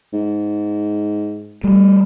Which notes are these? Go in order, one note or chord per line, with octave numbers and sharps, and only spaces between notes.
G#2
G3 A3